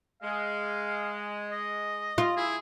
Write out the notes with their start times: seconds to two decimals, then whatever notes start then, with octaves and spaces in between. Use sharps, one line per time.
0.22 G#3 F5
1.51 D#5
2.18 F4
2.37 E4 G#4